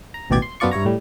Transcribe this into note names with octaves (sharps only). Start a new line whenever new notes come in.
A#5
A1 D#2 B2 G4 D5 G#6
C6
F#2 B3 D4 F4 D5 C#6
G2 E4 C#5 A#5
A2 G3